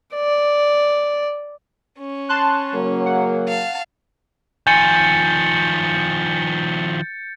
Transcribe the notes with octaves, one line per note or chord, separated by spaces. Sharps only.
D5
C#4
A5 C6 F#6
C#3 F#3 A#3
F#5
F5 A5
D#3 F3 G#5 G6 A6 C#7